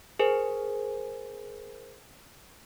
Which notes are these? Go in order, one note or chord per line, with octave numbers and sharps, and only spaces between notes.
G#4 A#4 C5 G#5